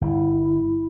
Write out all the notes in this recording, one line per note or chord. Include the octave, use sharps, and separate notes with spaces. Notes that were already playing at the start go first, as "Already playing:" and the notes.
G1 E4